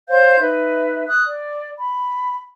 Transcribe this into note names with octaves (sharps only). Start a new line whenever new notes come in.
C5 C#5 F5 G6
D#4 B4 E5
D#6 F#6
D5
B5